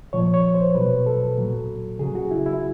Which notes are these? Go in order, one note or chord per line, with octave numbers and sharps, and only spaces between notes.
A#2 F3 C#5
C#5
C5
B2 F#3 B4
A4
A#2 F#3
C#3 F#3 G#4
F#4
E4
E4